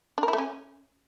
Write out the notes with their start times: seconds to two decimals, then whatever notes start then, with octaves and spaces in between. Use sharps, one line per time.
0.18 D4
0.23 A#4
0.28 E4
0.33 A3
0.38 C#4